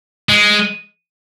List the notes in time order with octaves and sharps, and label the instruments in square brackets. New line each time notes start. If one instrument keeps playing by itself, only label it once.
[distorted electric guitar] G#3